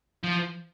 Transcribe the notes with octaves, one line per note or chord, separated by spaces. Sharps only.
F3